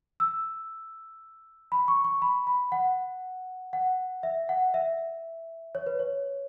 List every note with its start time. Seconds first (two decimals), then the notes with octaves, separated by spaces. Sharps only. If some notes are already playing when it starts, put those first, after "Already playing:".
0.20 E6
1.72 B5
1.88 C#6
2.04 C#6
2.22 B5
2.47 B5
2.72 F#5
3.73 F#5
4.23 E5
4.49 F#5
4.74 E5
5.75 C#5
5.87 B4
5.99 C#5